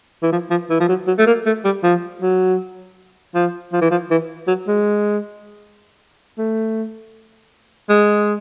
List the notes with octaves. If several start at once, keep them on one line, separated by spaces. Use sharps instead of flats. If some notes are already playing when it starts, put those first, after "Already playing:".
E3
F3
F3
E3
F3
F#3
F#3
A3
A#3
A3
G3
F3
F#3
F3
F3
E3
F3
E3
F#3
G#3
A3
G#3